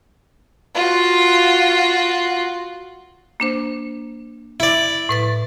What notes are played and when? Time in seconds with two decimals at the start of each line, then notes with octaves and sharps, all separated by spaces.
0.75 F4 F#4
3.40 A#3 D4 C5
4.60 E4 D5
5.09 A2 B4 A6